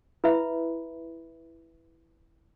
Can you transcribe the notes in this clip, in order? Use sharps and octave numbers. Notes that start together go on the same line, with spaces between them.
E4 B4 E5 B5